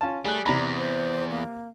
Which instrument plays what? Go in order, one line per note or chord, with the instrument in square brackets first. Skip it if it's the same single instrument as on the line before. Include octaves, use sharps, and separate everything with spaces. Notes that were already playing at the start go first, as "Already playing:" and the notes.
[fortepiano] C#4 F4 A5
[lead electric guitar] G3 [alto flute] A3 [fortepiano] G#4 F#6
[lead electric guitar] E2 [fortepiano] C3 A#5 B5 [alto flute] D5
[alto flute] C5
A#3